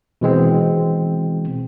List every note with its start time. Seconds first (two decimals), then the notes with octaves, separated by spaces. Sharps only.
0.21 B2 E3 G#3 C4